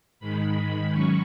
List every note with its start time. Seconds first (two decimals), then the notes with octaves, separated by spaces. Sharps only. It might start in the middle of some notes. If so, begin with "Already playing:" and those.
0.20 G#2 D#3 G#3 B5
0.93 F#3 C#4 C#6